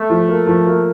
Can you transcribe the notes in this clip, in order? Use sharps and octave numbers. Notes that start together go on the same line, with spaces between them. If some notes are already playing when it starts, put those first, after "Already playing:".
Already playing: A3
F3
A#3
F3
A#3